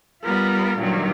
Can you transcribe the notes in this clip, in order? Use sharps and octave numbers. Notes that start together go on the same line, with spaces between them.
G3 B3 F4 A#4
G2 A#2 D#3 F#3